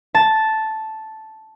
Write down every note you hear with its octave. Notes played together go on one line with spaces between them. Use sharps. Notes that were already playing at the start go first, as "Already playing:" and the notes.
A5